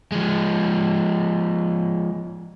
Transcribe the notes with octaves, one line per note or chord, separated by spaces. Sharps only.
F3 G#3